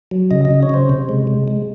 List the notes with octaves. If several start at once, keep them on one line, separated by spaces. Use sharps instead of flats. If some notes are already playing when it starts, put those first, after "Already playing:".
F#3
C#3 D#5
D#5
C#3
C#5
C#3 C5
C3
G#3
G#3
G#3